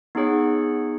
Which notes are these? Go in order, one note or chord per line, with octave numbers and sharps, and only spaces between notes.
B3 D#4 G#4 C#5 F#5